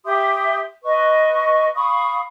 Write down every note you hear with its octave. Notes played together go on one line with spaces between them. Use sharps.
G4 E5 C6 D#6
B4 D#5 C#6
F5 B5 C#6 D#6